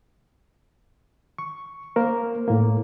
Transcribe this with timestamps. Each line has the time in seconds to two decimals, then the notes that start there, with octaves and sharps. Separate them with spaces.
1.38 C#6
1.96 A#3 A#4 C5
2.48 A2 A#3